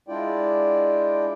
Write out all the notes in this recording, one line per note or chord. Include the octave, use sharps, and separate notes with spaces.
G#3 D4 E4 F4 D5 G5